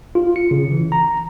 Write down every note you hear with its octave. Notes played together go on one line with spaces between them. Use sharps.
F4
C#7
C#3
E3
A#5